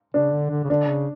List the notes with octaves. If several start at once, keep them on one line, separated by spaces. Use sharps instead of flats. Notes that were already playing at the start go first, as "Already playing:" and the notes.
C#3 D4
D3
D3
C#3
D3 D4
C#3